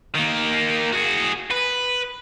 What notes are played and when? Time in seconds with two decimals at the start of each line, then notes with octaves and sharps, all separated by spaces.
0.15 D#3 A#3
0.92 F#4 G#4
1.51 B4